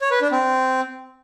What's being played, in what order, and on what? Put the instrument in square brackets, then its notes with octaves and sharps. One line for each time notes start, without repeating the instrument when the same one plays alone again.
[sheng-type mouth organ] C#5
B4
D4
C4